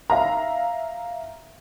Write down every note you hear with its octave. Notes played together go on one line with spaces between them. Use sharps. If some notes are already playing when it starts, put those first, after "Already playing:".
E5 F5 A#5